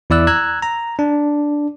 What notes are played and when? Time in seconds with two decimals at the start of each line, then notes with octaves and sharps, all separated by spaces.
0.10 E2 E4 D5 E6 F#6
0.27 A#5 E6 F#6 G#6
0.62 A#5
0.99 D4